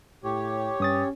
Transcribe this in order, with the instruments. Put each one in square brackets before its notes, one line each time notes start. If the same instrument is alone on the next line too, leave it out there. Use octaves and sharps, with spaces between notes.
[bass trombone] A2 [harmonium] G4 C#5
[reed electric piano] G2 D#6 A6 [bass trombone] C#4